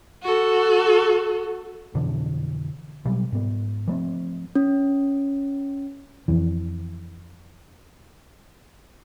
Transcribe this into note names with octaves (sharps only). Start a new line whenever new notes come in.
F#4 A4
F2 B2 D3 E3
B2 F#3 G3
G#2 B3
F3 A3 B3 C4
C#4
F2 E3